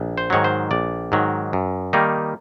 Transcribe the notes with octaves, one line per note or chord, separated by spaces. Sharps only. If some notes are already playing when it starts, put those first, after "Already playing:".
Already playing: A#1
C5
G#2 D#3 F#3 C#5
C5
A#1 D5
G#2 D#3 F#3
F#2
D#3 G3 A#3 D#4